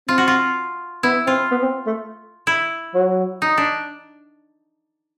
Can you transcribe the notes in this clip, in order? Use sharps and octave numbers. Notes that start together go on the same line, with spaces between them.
C4 F4
F#4
F4
B3 E4
C4 F4
B3
C4
A3
E4
F#3
D#4
D4